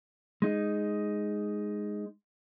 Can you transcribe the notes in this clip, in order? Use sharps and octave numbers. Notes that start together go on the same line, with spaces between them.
G#3 D#4